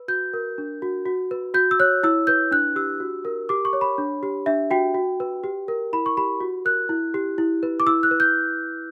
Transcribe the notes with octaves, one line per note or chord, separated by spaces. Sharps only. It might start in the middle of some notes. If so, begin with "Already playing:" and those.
Already playing: B4
F#4 G6
A#4
D4
F#4
F#4
B4
F#4 G6
E6
C#5 F#6
E4 E6
B4 G6
D4 F#6
G4 E6
F#4
A#4
G4 D6
C#6
C#5
B5
D4
G4
D4 E5
F#4 G5
F#4
B4
G4
A#4
E4 B5
C#6
G4 B5
F#4
A#4 F#6
E4
G4
E4
B4
D6
E4 E6
F#6
B4
G6